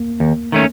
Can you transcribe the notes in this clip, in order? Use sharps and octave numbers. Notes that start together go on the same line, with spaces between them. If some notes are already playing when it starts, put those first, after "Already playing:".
Already playing: A#3
D#2
D#3 A3 C#4